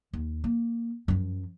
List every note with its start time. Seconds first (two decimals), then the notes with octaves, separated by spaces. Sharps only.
0.13 D#2
0.44 A#3
1.08 F#2 F3